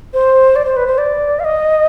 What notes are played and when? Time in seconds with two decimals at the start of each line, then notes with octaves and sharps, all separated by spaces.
0.14 C5
0.56 D5
0.65 C5
0.76 B4
0.87 C5
0.98 D5
1.40 F5
1.44 D#5